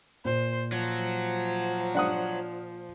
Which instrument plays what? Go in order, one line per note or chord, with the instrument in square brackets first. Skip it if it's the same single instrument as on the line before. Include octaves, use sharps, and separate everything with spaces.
[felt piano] A#2 [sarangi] C5
[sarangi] F3 [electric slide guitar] F#3
[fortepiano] D4 F#5 D#6